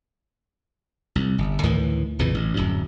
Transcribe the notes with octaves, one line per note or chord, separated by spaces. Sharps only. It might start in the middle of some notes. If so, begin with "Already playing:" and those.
C2
G1
D2 A2 D#3 E3
A#1 F2 C#3 E3
A1
D1 F#2